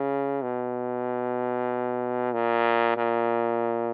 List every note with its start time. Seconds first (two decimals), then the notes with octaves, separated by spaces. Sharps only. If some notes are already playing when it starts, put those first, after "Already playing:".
Already playing: C#3
0.42 B2
2.33 A#2
2.97 A#2